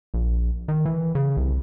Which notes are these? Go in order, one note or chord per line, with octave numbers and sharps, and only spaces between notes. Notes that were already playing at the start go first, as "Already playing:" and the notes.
A#1
D#3
E3
C#3
C2